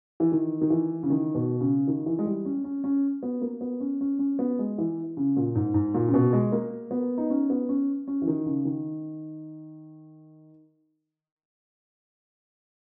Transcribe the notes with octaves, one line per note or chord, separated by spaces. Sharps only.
E3
D#3
D#3
E3
C#3
D#3
B2
C#3
D#3
E3
G#3
G3
C#4
C#4
C#4
B3
A#3
B3
C#4
C#4
C#4
B3
G#3
E3
C#3
A#2
G#2
G#2
A#2
C#3
B2
G#3
A#3
B3
D#4
C#4
B3
C#4
C#4
E3
D#3
C#3
D#3